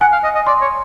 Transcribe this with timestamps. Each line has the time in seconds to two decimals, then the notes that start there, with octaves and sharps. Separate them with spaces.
0.01 F#5 G#5
0.12 F5
0.24 D#5
0.35 D#5
0.47 D5 C6
0.61 C#5